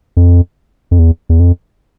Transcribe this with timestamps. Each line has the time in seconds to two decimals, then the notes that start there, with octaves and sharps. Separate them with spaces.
0.17 F2
0.91 F2
0.99 E2
1.29 E2
1.40 F2